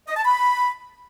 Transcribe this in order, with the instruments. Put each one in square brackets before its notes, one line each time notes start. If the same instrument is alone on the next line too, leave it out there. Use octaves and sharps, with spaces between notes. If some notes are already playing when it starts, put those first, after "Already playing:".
[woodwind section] D#5
A5
B5